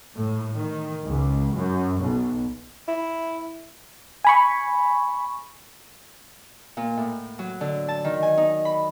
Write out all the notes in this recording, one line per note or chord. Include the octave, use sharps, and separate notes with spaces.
A2
D#3
C#2
F#2
B1
E4
G#5 B5 C#6
A#2
A2
F#3
D3
A5
D#3
G#5
D#4
B5